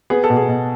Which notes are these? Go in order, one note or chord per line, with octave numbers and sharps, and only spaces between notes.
B3 G#4
A4
B2
G#4
B2